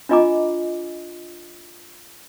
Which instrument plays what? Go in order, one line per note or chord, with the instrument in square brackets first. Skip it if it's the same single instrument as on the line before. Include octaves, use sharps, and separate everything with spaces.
[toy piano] D4 F4 D#5 G#5 A#5 D6